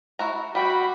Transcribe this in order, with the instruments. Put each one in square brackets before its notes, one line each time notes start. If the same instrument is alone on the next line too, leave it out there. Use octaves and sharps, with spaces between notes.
[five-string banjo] E4 F#4 A#5
[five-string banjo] G3 G5 [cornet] F#4 [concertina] B5